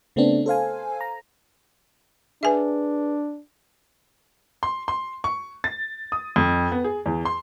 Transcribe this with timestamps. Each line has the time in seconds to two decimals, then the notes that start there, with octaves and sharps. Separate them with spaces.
0.16 C#3 A3 B3 C4 D4
0.46 A4 C5 F5 G#5
1.01 A#5
2.43 D4 G#4 B4 E5 G#5
4.63 C6
4.88 C6
5.24 C#6
5.64 A6
6.12 D#6
6.36 F2
6.72 B3
6.84 G#4
7.06 E2
7.25 C6